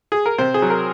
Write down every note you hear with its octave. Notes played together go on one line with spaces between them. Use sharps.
G#4
A#4
C3 C5
G#4
F#3
A#4